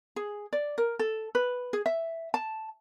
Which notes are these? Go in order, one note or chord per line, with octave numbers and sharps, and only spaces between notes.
G#4
D5
A#4
A4
B4
G#4
E5
A5